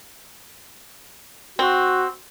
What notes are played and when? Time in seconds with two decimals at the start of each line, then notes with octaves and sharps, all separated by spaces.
1.59 C4 F#4